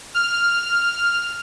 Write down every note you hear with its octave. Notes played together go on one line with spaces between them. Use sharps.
F6